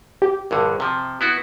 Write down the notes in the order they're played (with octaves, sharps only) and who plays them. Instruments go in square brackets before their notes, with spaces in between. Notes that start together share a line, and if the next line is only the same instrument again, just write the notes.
[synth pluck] G4
[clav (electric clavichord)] A#1 G2 D3
C3 F3
B3 E4 F#4